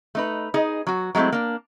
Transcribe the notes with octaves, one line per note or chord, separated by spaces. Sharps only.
A3 D#4 B4
D#4 G#4 D#5
F#3 F#4
F#3 G#3 A3 C4 E4
A#3 D4